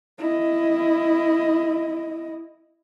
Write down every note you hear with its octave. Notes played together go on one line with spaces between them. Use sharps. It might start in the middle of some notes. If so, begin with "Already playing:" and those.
E4 D#5